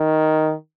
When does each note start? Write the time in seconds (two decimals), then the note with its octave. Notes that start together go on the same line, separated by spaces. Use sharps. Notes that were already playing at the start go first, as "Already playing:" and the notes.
Already playing: D#3